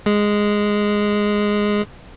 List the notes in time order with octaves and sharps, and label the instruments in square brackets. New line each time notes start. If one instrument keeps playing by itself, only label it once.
[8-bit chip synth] G#3 G#4